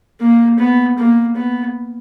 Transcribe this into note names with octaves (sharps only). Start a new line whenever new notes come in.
A#3
B3
A#3
B3